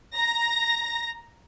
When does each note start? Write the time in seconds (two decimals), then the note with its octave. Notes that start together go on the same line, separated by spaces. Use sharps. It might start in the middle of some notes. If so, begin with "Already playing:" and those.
0.15 A#5 A#6